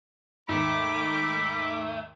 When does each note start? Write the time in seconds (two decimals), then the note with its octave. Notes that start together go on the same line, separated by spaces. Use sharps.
0.49 D#2 G#2 A3 B5 D6